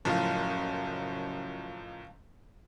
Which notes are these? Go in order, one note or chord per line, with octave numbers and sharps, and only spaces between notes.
F#1 F#2 A2 F3 F5 A5